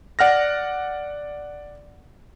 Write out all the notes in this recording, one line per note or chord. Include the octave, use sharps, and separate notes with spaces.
D5 F#5 F6 A#6